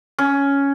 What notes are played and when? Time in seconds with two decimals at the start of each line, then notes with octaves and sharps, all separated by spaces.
0.19 C#4